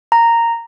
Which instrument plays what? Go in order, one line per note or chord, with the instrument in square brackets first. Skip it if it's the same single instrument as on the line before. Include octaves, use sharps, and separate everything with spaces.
[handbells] A#5